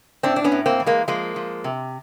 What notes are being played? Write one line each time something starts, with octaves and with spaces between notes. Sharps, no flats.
A2 C4 D4
D4
B3 C#4
A2
A#3 C4
E3
G#3 A#3
F3 G#3 A#3
F3
C3